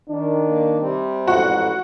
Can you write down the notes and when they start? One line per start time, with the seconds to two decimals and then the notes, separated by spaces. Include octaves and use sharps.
0.10 D#3 D4
0.44 A#3
0.78 C3 G3 C4
1.27 A1 F2 G#2 F#4